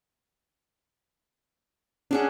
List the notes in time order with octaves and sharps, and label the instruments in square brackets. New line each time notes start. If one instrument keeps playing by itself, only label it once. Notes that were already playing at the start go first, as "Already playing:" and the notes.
[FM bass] C#4 [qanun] D4 G#4 F#5